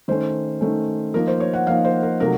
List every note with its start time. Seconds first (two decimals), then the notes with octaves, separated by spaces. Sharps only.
0.08 D#3 A3 C#4 C5
0.61 D#3 A3 C#4
1.14 F3 A#3 D#4 A#4
1.27 C5
1.40 C#5
1.54 F#5
1.67 F3 A#3 D#4 F5
1.85 C5
2.03 A#4
2.20 C3 F#3 A3 D#4 A#4